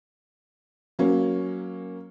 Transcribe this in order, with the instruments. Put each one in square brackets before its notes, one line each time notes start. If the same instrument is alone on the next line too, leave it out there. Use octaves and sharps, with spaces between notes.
[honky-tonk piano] F#3 A#3 C#4